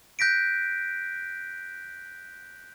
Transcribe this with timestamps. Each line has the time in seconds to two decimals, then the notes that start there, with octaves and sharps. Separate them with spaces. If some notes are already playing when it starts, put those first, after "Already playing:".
0.19 F#6 G6 A#6 B6 D7